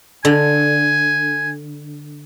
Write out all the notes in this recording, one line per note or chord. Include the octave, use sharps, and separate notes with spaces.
D3 G#5